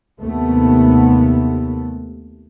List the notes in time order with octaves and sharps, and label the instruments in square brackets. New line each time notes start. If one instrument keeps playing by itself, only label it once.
[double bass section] D#2 C3 A3 B3